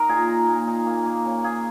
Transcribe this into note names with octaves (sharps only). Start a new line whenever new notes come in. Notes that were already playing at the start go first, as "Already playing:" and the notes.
Already playing: D#4 A#4
A#2 G#4
D#4
A#2
D#4
A#3
A#3
C#3
A#3 G#4